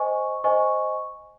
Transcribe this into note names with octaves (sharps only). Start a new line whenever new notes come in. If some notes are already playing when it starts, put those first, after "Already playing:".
Already playing: C5 D#5 G#5 C#6
C5 D#5 G#5 C#6